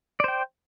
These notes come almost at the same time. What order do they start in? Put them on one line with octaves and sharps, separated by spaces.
D5 C5 G5